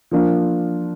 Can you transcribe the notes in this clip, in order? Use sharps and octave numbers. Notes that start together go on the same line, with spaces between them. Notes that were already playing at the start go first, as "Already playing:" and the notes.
F3 A#3 D4 F4